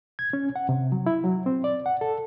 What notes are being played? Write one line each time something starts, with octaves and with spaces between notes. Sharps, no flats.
G#6
C#4
F#5
C3
F#3
E4
F#3
C4
D5
F#5
A4